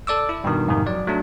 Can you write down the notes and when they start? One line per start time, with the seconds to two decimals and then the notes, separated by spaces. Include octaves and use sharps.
0.07 A4 D5 D6 E6
0.29 E4
0.44 G2 B2 D#3
0.68 F2 G#2 C3 D#3
0.86 F#3 D5
1.07 F#3 A3 D4